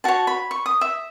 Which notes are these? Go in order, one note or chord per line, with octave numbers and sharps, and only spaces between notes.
F#4 C#5 A5
B5
C#6
D#6
E5